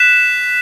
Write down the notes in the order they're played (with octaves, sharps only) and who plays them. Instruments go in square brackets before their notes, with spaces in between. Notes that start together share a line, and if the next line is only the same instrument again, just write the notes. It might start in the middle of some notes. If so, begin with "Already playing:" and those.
Already playing: [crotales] F#6 B6 E7